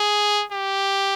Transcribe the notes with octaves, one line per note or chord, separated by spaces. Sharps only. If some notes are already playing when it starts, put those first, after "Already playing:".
Already playing: G#4
G4